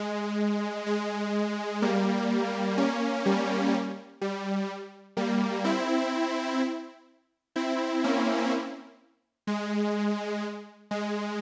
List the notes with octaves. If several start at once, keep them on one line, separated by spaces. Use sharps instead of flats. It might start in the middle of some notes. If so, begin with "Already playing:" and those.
Already playing: G#3
G#3
G3 A#3
A#3 C#4
G3
G3
G3 A#3
C4 E4
C4 E4
A#3 C#4
G#3
G#3